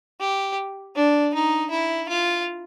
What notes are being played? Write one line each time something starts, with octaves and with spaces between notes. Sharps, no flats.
G4
D4
D#4
E4
F4